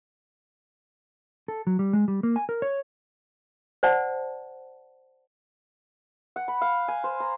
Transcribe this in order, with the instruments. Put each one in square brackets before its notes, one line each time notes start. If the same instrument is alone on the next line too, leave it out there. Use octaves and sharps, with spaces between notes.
[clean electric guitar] A4
F#3
G3
G#3
G3
A#3
G#5
A#4
C#5
[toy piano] C5 D5 F#5 A5
[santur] F#5
B5
F5
G#5
C5
A#5